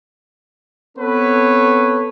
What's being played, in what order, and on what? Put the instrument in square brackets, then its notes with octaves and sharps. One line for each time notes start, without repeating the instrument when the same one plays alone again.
[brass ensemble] B3 C4 A4 B4 C#5